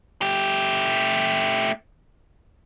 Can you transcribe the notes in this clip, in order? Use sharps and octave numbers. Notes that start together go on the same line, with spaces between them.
A3 G4